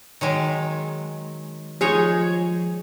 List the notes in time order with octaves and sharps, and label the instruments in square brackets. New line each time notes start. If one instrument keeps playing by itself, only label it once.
[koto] D#3 F#3 G#3
[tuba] F3 [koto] G#3 D#4 C#5 [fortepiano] G#4